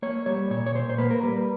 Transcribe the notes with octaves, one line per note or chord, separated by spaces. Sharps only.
A#3 C#5
G3 C#5
A#2 C#5
C#5
A#2 C5
C5
A#3 B4
A#4
G3 B4